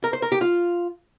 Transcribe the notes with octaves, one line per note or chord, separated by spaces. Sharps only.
A#4
C5
A#4
G4
F4